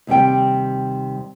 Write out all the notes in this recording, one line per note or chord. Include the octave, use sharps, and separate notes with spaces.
D#2 C3 G3 G5